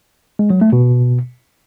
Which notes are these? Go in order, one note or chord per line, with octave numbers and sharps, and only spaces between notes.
G#3
F#3
A3
B2